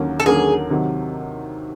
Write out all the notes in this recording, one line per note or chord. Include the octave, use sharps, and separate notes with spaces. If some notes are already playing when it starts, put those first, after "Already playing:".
Already playing: D#2 D3 F#3 A#3 C#4
A4
D#2 D3 F#3 A#3 C#4 G#4
C3 D#3 F#3